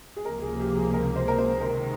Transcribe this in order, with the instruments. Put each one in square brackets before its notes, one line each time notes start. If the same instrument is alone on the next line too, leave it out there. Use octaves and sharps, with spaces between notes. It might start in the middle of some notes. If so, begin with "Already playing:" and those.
[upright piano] G#4
[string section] C#2 C3 F3 A#3 [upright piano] A#4
[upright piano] G#4
G4
G#4
A#4
C5
A#4
C5
[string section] C3 D#3 G#3 [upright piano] A#4